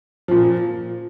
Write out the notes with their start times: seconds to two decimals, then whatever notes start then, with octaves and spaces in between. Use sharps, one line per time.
0.28 A#2 F3